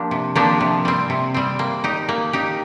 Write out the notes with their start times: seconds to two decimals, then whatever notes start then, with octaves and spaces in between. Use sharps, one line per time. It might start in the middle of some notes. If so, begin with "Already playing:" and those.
Already playing: F3 A#3 D4 G4
0.11 C3
0.35 F3 A#3 D4 G4
0.61 C3
0.85 G3 C4
1.10 C3
1.34 G3 C4
1.59 A#3
1.84 D#4 G4
2.09 A#3
2.33 D#4 G4